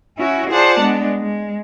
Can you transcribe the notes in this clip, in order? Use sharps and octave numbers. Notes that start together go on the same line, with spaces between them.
C#4 E4 F#4
F4 G#4 C5 D5 F#5 A5
G#3 B3 D4
G#3